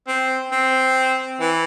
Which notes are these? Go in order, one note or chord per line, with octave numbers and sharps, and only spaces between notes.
C4
C4
E3